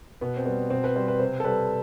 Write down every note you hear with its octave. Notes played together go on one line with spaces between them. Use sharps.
B2 B3
C4
G3 B3
B2 C4
B4
G3 C5
B4
C3 C5
A4
G3 B4